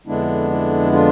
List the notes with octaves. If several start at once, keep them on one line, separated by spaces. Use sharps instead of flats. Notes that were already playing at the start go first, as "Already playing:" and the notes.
F2 D3 G#3 B3 D4 E4
E4
D4 F4